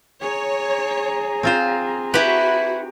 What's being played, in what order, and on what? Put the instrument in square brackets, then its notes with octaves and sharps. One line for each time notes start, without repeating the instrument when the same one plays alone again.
[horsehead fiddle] G#4 A#5 [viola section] C#5
[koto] C4 F4 C5
[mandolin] E4 B4 [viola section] F#4 [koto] G4